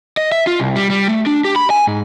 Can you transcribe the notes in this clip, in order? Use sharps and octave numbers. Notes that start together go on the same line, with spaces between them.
D#5
E5
F4
C2
G3
G3
A3
D4
G4
B5
G#5
G#2